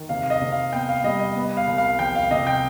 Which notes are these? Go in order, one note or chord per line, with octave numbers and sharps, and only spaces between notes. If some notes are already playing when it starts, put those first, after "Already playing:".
Already playing: D#3
C3 F5
F5
D#5
C3
F5
B3 G5
F5
G3 D#5
D#5
B3
F5
C2
F5
F3 G5
F5
C3 D#5
G5